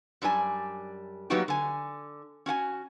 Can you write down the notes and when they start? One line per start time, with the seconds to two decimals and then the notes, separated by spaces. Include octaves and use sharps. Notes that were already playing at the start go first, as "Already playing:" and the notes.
0.22 F#2 G3 D4 G4 G#5
1.30 F#3 A#3 B3 D#4 F#4 G4
1.48 D3 G#5
2.46 C#4 F#4 F#5 G#5